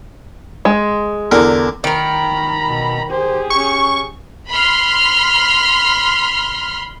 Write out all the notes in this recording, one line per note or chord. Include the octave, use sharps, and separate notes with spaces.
G#3
E2 D3 A#4
D#3 A#4 A#5 B5
B2
G4 G#4 C5
C#4 C#6
B5 C6 F6 C7